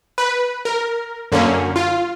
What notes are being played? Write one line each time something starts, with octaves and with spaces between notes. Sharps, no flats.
B4
A#4
F#2 D3 A#3 C#4
F4